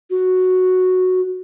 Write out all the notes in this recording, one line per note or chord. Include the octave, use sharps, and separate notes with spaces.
F#4